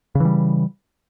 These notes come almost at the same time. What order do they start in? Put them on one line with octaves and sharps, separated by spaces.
C#3 E3 G3